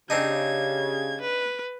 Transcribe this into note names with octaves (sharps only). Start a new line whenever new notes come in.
C#3 C4 D4 D#4 G4 G#6
B4